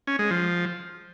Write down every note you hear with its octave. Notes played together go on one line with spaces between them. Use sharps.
C#4
G#3
F3